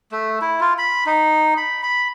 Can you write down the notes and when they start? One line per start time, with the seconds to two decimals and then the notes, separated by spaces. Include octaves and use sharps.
0.12 A3
0.41 E4
0.60 F4
0.78 B5
1.06 D#4
1.57 B5
1.83 B5